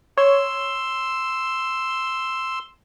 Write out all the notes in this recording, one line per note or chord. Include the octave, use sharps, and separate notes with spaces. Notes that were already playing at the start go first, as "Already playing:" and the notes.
C#5 C6 E6